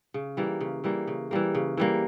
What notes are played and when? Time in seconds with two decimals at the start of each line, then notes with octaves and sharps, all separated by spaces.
0.14 C#3
0.37 E3 G3 A#3
0.61 C#3
0.84 E3 G3 A#3
1.07 C#3
1.31 E3 G3 A#3
1.55 C#3
1.77 E3 G3 A#3